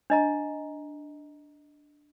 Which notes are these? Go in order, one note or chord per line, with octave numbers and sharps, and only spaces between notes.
D4 D#5 A#5